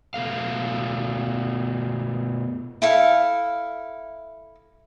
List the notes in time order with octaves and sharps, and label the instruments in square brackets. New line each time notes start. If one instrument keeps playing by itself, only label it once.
[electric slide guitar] B2 A3 F5
[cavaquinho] E4 A4 F5